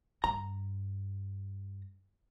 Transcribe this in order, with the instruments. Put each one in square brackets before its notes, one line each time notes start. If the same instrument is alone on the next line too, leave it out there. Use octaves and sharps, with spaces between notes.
[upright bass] G2 [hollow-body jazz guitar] A#5